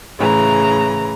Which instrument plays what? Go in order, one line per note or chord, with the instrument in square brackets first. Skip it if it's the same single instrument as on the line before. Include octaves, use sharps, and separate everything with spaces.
[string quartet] A2 C#3 E3 A#5